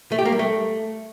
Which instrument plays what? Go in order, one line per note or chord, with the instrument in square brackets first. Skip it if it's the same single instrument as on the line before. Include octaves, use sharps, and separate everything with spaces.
[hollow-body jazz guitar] A3
G4
A#3
G3
A3